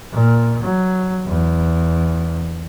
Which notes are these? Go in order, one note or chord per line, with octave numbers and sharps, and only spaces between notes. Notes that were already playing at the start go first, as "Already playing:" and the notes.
A#2
F#3
E2